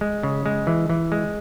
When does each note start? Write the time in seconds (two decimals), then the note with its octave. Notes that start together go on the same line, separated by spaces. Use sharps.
0.01 G#3
0.23 C#3
0.46 G#3
0.67 E3
0.90 E3
1.12 G#3